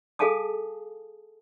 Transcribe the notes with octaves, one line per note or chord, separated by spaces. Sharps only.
G#4 A4 F5 G#5 A5 D#6